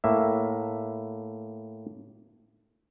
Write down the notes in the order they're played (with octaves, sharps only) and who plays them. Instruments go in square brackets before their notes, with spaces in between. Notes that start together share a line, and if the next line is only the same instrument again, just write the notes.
[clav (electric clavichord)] A2 A#3 E5